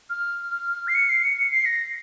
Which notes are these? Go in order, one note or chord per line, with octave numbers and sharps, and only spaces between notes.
F6
C7
C#7
C7
C#7
C#7
C7
A#6